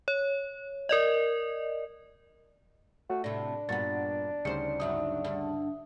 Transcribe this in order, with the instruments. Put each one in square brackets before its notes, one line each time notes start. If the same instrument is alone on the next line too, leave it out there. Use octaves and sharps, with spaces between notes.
[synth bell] C#5
A#4 D5 D#5
[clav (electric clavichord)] A3 [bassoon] F#4
[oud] A2 C3 [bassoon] D4 [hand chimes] A#6
[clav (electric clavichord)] G2 A#2 [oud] B3 F#4 [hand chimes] A6
[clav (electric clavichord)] D2 C#3 G3 [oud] D#4 C5 [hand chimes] C#7
[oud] G2 F#3 D#4 [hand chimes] E5 D#6
[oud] G2 D3